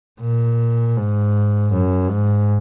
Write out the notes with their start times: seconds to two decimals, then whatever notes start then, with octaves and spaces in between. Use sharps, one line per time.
0.22 A#2
0.97 G#2
1.72 F#2
2.10 G#2